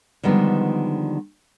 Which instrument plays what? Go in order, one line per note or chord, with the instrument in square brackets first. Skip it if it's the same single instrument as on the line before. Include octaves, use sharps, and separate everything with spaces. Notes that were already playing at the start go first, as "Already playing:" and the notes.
[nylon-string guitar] D3 D#3 F3 G3 G#3 B3